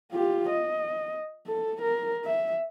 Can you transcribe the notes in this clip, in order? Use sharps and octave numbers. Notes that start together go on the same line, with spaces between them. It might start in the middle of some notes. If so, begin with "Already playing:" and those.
F4 G4
D#5
A4
A#4
E5